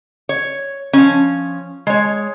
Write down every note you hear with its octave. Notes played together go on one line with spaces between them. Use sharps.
C#5
F3 C#4
G#3 C#5